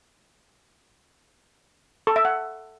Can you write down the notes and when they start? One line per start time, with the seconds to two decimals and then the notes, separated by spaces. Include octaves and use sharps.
2.07 A4
2.16 E5
2.25 F#5